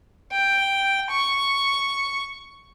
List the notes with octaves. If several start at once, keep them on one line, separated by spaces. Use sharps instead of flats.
G5
C#6